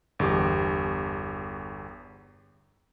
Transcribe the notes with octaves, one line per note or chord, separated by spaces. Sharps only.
G1 E2 G4